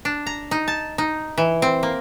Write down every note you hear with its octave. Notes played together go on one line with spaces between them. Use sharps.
D4
A#5
D#4
A5
D#4
E3
C4
A#3